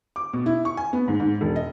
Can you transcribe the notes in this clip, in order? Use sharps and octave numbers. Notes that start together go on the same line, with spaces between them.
D6
B2
E4
C#6
G#5
B3
G#2
G#2
E1
D#5